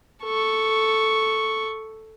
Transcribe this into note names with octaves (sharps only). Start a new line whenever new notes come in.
A4 C#6